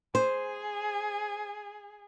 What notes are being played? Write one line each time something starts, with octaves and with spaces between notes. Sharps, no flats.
G#4 C5